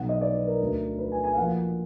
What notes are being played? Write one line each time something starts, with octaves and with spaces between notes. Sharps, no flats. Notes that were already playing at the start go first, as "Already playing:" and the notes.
Already playing: B1 B2 F#5
D#5
D5
B4
A#4
D2 D3
B4
G#5
G#5
F5
A#1 A#2 F#5